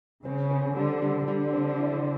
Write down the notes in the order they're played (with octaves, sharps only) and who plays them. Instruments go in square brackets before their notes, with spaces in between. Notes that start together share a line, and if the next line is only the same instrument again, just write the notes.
[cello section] C#3 [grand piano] C4
[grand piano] C4
[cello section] D3 [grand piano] G3
[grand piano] G3
[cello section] D3 [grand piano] G3
[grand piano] C4
E4